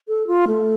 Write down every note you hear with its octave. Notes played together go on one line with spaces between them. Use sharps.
A4
F4
A3